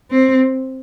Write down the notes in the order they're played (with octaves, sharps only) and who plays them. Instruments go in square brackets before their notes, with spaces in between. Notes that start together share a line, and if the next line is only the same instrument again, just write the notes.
[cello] C4